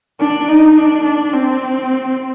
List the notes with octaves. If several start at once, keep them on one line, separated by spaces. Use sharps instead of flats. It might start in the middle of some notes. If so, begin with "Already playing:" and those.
D4
D#4
D4
D4
C4